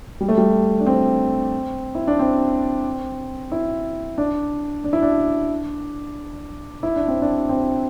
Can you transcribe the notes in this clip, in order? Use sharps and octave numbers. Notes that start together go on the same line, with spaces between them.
G3
A3
G3
D4
C4
E4
D4
C4
E4
D4
D4
E4
D4
E4
D4
C4
D4
C4